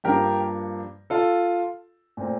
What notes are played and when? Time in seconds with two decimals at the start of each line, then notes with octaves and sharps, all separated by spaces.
0.04 G2 F3 A#3 D4 G4 A#4
1.10 F4 A4
2.17 A#2 A3 C4